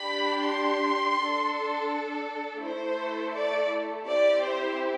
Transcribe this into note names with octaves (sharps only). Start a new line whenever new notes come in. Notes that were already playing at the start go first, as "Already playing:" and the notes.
Already playing: D4 G4 B5
C6
D4 A4
A3 E4 A4 C5
D5
C4 E4 G4 D5
C5